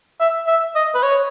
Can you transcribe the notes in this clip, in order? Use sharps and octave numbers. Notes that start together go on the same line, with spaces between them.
E5
E5
D#5
B4
C#5